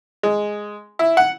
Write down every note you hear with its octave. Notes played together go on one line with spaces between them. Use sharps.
G#3
E4
F#5